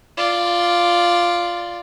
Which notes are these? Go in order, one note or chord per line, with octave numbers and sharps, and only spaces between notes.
F4 D5